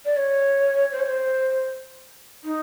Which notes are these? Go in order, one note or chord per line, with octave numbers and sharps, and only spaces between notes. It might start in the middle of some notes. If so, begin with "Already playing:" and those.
D5
C#5
C5
C#5
C5
D#4